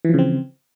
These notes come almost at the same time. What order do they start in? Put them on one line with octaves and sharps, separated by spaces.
E3 F3 C#3 C4